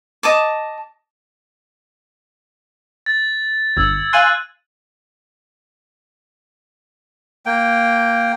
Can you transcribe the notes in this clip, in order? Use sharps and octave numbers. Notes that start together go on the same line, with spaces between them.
D#5 A5 D6
A6
G1 E6 G#6
F5 G#5 C6 F#6 D#7 F#7
A#3 G5